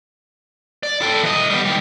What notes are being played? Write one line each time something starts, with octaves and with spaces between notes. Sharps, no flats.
D5
A4 G5
E3 D#5
G3 B3
D#3 G3